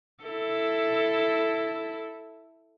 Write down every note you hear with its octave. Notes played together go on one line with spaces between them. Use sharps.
E4 A4